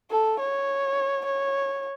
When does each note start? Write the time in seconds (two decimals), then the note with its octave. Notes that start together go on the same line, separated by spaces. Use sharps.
0.10 A4
0.39 C#5
1.25 C#5